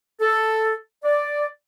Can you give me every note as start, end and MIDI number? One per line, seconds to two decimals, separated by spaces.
0.20 0.74 69
1.03 1.46 74